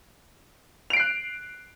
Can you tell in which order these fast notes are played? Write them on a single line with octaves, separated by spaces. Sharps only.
F7 D7 C7 F#6